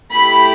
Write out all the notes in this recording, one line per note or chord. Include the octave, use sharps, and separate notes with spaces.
A3 E4 G4 B5